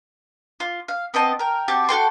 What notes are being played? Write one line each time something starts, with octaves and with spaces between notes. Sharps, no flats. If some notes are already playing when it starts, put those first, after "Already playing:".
F4
F5
B3 C4 D#5 A5
A#4 G5
C4 F#4 G4 A5
F#4 A4 G5 C6